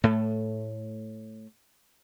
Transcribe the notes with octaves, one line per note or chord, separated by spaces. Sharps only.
A2 A3